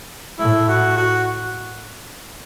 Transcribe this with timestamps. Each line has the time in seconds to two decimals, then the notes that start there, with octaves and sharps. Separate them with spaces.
0.39 A2 E4
0.69 F#4
0.97 F#4